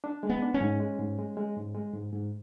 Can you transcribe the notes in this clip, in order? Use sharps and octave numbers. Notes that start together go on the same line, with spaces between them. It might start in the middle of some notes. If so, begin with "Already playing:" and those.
D4
G#3
B3
D4
C#4
G#2
G#3
G#2
G#3
G#3
G#2
G#3
G#2
G#2